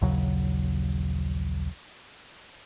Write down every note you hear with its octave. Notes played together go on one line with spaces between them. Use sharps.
A#1 D#2 C#3 F#3